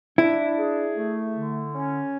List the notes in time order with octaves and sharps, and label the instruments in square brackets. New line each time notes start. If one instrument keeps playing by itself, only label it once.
[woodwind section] D4 [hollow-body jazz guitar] E4
[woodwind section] G#4
A3
D3
C#4